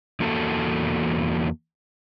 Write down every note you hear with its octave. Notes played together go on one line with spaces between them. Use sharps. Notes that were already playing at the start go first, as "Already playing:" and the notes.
E2 A#3 F#4 A4